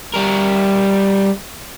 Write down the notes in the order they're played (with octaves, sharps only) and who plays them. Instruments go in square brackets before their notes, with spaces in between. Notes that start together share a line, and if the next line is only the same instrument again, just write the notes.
[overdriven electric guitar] G3 A#4